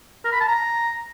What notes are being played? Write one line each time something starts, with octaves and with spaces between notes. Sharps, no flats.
A#4
B5
A5
A#5